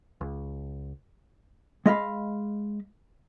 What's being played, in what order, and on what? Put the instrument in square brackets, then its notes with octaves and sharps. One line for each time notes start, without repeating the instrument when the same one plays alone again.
[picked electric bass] C#2
[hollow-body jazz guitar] G#3 D#5 F5 B5